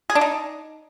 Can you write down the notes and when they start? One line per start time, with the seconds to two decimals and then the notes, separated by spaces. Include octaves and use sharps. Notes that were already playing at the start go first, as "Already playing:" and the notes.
0.10 G#4
0.15 D4
0.21 D#4